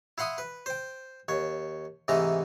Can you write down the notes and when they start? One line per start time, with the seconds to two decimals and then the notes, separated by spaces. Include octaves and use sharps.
0.18 E4 F5 F#5 C6 D#6
0.38 B4
0.66 C5 G5
1.28 D#2 C#5
2.08 G#2 C3 E3 A3 A#5